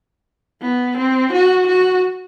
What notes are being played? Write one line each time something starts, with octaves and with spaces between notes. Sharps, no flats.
B3
C4
F#4
F#4